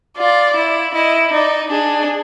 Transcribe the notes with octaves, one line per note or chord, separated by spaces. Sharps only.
F4 D5
E4
E4 D#5
D#4 D5
D4 G#4